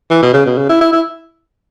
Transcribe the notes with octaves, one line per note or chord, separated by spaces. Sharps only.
E3
B2
C#3
B2
C#3
E4
E4
E4